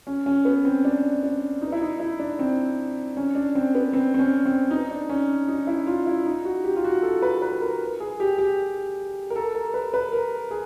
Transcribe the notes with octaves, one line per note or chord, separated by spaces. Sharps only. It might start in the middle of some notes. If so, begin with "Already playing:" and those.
C#4
C#4
B3
C4
D4
D4
D#4
E4
D#4
E4
D4
C4
C#4
D4
C4
B3
C4
C4
C#4
C4
D#4
D4
C#4
D#4
E4
F4
E4
D#4
F#4
G4
F4
F#4
A4
B4
B4
A#4
G#4
G4
G4
A#4
A4
A#4
B4
B4
A#4
G#4